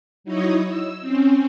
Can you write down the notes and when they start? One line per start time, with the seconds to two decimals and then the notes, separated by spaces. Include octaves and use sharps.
0.24 F#3 D#4 E4 C#5 D#5
0.68 E6
1.01 C4 C#4